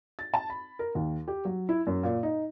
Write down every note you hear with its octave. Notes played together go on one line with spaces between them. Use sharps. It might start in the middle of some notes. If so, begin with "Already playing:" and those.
A6
A5
B5
A#4
D#2
G4
F#3
E4
F#2
A#2
D#4